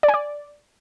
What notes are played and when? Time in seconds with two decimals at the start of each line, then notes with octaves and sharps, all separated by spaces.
0.03 D5
0.08 G#5
0.14 D5